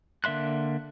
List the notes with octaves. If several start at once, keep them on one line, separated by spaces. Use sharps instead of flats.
D3 A#3 E5 C6 F#6